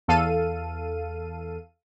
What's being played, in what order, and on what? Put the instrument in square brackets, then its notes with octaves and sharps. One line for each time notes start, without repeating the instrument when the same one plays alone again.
[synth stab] E2 A4 F5 D#7